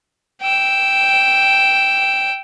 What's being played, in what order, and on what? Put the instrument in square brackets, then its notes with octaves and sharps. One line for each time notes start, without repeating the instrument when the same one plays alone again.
[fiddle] G5 E6